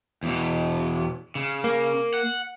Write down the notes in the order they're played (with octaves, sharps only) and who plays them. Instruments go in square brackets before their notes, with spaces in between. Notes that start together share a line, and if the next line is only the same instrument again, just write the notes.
[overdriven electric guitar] E2 B2
C#3
[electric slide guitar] A#3
[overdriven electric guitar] F#5